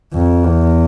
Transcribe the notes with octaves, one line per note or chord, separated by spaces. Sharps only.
F2
E2